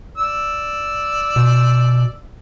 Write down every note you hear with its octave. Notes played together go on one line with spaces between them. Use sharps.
D5 E6
B2